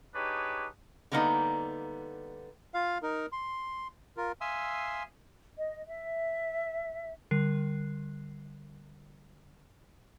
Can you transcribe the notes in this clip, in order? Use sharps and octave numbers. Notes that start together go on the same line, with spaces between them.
D4 D#4 G4 G#4 B4 C#5
D3 G3 A#3 B3 C#4 D#4
F4 F5
D#4 A#4
C6
F4 A#4
E5 F5 G#5 C6 D#6 E6
D#5
E5
D3 G3 A#4 F#6 C7